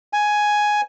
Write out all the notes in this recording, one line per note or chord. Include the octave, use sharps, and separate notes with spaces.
G#5